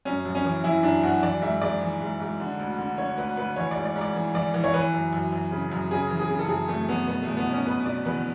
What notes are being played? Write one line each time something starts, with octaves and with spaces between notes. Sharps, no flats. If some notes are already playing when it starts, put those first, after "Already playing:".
F#2 C#4
F#2
C#4
E3
E3 E4
F#2 D4
F#2 F#4
E3 D5
G#2 E5
G#2 D5
E3
G#2
G#2
D3
D2
D3
D3 C#5
D2 B4
D2 B4
E3 C#5
G#2 D5
D5
G#2
D5
E3
E3 D5
E3
C#5
E3 B4
F#2
F#2
F#2
C#3
F#2
C#3 G#4
E3
G#4
C#3
A4
F#2 G#4
F#2 A3
F#2 B3
B2 B3
E2 A3
B3
B2 C#4
B2 B4
B2 D5
E2 B4